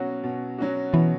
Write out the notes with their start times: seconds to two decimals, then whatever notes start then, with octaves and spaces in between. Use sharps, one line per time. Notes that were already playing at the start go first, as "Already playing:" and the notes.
Already playing: B2 F#3 C#4 F#4
0.24 B2
0.58 F#3 C#4 F#4
0.93 B2 E3